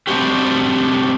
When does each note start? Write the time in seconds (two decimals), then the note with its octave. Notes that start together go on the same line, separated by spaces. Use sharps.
0.07 G3 A3 C4 D4 F#4 G4